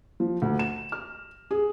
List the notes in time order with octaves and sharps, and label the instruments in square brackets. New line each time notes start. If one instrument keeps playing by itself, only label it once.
[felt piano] F3
D2
E7
F6
G#4